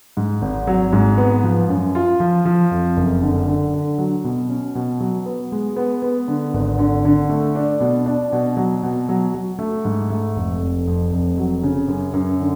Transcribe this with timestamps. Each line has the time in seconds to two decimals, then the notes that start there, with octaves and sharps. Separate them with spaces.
0.17 G#2
0.42 G#1
0.67 F#3
0.93 G#2
1.18 B3
1.43 F3
1.69 F#2
1.95 F4
2.20 F3
2.45 F3
2.71 F2
2.97 F#1
3.22 D3
3.48 D3
3.74 D3
3.98 F#3
4.24 B2
4.49 C#4
4.75 B2
5.00 F#3
5.26 B3
5.52 G#3
5.76 B3
6.02 B3
6.28 D3
6.54 G#1
6.79 D3
7.05 D3
7.30 A3
7.56 D4
7.80 B2
8.06 D4
8.32 B2
8.57 F#3
8.83 B2
9.09 F#3
9.34 F#3
9.59 A3
9.85 G#2
10.10 A3
10.36 F1
10.61 F1
10.87 F2
11.12 F1
11.38 F#3
11.63 C#3
11.88 F#2
12.13 F#2
12.40 D3